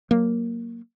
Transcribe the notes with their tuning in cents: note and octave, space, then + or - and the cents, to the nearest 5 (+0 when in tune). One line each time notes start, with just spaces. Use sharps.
F#3 +0 A#3 +0